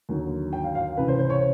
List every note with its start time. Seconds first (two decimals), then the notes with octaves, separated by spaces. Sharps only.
0.09 D#2 D3 F#3
0.53 G5
0.64 F5
0.75 F5
0.97 C#2 C3 E3 B4
1.08 C5
1.19 C5
1.30 C#5